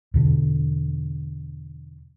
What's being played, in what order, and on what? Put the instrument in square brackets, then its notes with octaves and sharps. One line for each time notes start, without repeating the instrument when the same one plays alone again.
[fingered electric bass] E2 B2 D3